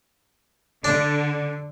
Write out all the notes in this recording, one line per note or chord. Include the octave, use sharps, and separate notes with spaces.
D3 D4